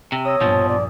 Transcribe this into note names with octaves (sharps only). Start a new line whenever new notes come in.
C3
C#5 D#6 E6 A#6
A#1 G2 B2 F3
D5